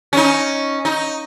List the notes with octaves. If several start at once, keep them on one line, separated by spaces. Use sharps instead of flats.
C#4 D#4
D#4